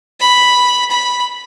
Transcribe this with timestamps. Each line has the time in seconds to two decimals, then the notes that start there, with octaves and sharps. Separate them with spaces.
0.20 B5
0.90 B5